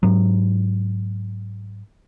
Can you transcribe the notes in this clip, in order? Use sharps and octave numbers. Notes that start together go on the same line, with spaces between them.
G#2 F#3